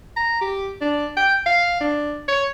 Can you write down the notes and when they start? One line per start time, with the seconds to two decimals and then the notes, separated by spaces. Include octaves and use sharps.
0.17 A#5
0.41 G4
0.81 D4
1.17 G5
1.46 F5
1.81 D4
2.28 C#5